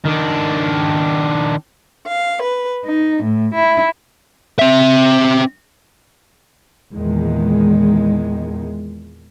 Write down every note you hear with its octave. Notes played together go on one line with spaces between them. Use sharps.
D#3 D4
F5
B4
D#4
A2
E4
C4 E5
E2 A#2 D#3 G#3